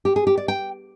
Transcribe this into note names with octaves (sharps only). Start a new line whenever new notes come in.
G4
G#4
G4
D5
G5